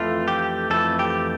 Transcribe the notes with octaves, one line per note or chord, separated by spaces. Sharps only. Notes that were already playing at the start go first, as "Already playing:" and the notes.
Already playing: F2 E3 A3 F4
G4
F2 E3 A3 A4
G4